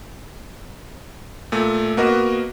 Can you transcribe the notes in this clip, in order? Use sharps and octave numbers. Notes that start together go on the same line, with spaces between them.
A#2 A3
A#3 B3 F#4 A#4 D#5